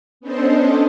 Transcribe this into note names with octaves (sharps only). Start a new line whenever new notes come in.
B3 C#4 D4 A4 C5 D#5